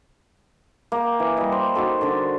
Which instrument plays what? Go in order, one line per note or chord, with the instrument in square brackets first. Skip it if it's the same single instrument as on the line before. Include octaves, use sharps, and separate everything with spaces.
[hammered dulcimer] A#3 G5
E3
G3 D#5
C5
D#4 F#4 A4
D3 A#4 D5